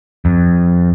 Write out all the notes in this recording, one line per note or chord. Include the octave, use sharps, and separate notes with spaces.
F2